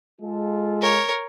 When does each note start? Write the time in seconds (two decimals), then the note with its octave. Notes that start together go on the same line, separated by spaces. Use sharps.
0.21 G#3 F4 A4
0.82 A#4 C#5